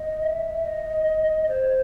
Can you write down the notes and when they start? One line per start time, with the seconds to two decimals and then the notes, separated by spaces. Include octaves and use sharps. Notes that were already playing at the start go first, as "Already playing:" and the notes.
Already playing: D#5
0.23 E5
0.65 D#5
1.48 C5